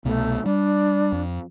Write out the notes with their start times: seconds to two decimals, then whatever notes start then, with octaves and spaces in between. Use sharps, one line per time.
0.05 C2 B2 A3
0.46 G3 D4
1.12 F2